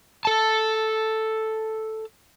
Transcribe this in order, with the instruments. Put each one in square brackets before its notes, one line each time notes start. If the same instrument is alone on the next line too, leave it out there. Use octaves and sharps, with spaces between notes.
[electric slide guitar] A4 A5